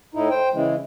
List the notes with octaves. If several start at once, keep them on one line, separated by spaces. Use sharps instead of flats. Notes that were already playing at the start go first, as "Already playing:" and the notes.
A2 D#4 E4
C5 G5
C#3 E3 G#3